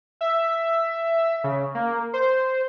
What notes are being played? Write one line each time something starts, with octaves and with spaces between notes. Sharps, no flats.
E5
C#3
A#3
C5